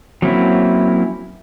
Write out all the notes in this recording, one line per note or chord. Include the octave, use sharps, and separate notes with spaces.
F#3 A#3 C4 C#4 E4